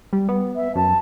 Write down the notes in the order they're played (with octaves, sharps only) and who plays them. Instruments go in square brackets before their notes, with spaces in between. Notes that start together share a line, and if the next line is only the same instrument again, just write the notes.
[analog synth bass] G3
B3
[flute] E5
[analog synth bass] F#2 [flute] A5